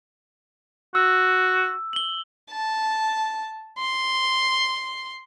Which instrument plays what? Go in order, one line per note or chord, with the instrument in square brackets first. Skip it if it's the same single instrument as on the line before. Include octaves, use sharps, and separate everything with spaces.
[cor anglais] F#4 [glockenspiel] E6
[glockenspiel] F#7 G7
[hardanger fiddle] A5
C6